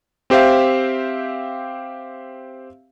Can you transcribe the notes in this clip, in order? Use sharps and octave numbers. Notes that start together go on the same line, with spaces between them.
C4 G4 C5 E5 F5